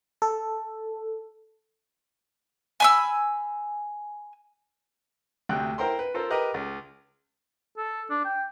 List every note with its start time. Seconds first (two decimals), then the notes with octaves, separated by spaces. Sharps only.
0.22 A4
2.80 G#5 B5 E6
5.49 D2 C3 G5 F#6
5.78 E4 A#4 C5 G5 A#5 C6
5.99 B4
6.14 F4 A4 A#4 C5
6.30 G4 A#4 B4 D#5 A#5
6.54 C#2
7.78 A4
8.10 D4
8.25 G5